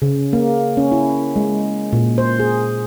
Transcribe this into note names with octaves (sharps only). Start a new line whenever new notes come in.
C#3
A#3
C#4
E4
G#3
A#2
C5
G#4